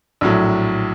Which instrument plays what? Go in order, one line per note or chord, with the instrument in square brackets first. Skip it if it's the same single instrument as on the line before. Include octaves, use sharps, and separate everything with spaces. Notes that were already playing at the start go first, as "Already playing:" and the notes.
[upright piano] A#1 A2 F#3